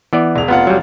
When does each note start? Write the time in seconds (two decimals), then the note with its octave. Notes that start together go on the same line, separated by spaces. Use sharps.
0.13 E3 B3 D5
0.36 E1 F7
0.48 F1 B3 F4 F#5
0.67 F#3 G3